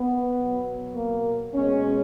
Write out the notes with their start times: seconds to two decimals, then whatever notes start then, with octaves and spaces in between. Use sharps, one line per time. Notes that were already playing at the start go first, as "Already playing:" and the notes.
Already playing: B3
0.37 B2 F#3
0.95 A#3
1.54 B2 G#3 C#4